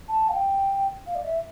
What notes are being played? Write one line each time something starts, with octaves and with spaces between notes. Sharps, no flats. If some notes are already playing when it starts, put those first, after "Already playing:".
A5
F5
G5
F5
D5
E5